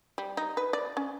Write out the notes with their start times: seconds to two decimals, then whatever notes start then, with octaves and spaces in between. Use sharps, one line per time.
0.18 G3
0.37 D#4
0.57 B4
0.73 D5
0.97 C#4